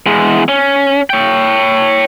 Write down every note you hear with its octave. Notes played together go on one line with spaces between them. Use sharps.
E2 G#3
C#4
C#5 G5